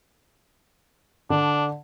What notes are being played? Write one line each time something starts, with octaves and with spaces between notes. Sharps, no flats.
D3 D4